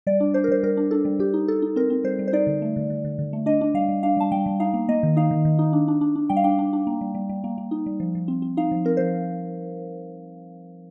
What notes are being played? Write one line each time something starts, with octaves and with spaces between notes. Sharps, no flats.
G3 D5
D4
D4 C5
A#4
G3 C5
G3 A#4
D4
D4 A4
G3
G3 G4
D#4
D#4 A4
D#4
C4 A#4
C4
G3 C5
G3
C5
D#4 D5
D3
A3
D3
D3
D3
D3
A3
D4 D#5
D4
G3 F5
G3
D4 F5
G3 A5
G3 G5
G3
D#4 F5
A#3
A#3 D#5
D#3
D#4 F5
D#3
D#3
D#4
D4
D4
D4
D4
G3 G5
F5
D4 G5
D4
D4
A#3
G3
G3
G3
A#3
A#3
D#4
G3
F3
F3
C4
C4
D#4 F5
F3
C4 A#4
F3 C5